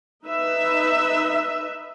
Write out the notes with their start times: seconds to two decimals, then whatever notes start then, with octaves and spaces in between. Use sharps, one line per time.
0.24 D#4 B4 E5